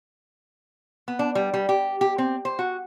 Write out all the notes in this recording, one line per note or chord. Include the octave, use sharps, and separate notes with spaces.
B3
D4
G3
G3
G4
G4
C4
C5
F#4